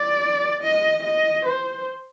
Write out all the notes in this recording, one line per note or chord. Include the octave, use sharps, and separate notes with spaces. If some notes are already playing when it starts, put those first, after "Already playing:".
Already playing: D5
D#5
D#5
C5